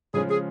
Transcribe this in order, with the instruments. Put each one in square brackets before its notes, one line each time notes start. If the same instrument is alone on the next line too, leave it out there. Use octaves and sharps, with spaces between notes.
[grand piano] C#3 F3 G#3 C#4 [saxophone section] G#4
[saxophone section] G#4